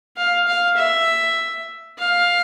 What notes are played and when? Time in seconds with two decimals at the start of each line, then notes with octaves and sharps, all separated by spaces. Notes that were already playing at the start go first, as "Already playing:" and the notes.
0.17 F5
0.47 F5
0.77 E5
1.99 F5